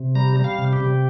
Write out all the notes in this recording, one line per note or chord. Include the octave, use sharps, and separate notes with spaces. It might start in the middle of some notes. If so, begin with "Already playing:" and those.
Already playing: C3
G3 A#5
G3
F5
C3
G4
C3